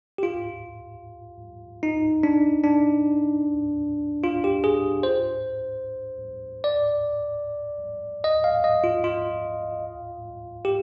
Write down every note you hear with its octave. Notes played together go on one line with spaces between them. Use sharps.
G4
F4
D#4
D4
D4
F4
G4
G#4
C5
D5
D#5
F5
D#5
F4
F4
G4